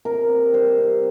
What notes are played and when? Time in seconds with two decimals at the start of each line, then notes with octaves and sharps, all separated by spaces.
0.05 C3 A#4
0.29 C4
0.53 G3 C5
0.78 C3